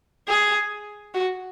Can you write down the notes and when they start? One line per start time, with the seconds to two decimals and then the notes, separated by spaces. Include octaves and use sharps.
0.28 G#4
1.14 F#4